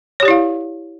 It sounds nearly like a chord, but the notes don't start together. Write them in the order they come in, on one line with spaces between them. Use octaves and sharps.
C#5 G4 D5 E4 F5